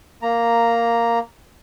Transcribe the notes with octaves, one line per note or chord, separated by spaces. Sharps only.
A#3 A#5